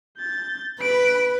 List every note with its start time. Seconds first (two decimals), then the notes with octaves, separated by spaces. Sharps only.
0.18 G6 A6
0.81 B4 B5 D7